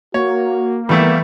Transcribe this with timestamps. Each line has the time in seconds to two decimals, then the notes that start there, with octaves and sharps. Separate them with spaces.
0.14 A#3 F#4 C#5
0.89 E3 G3 A3 B3 E4